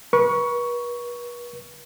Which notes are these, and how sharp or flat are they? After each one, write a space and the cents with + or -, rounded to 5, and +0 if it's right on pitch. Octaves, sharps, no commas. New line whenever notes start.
B4 -40 C#6 +10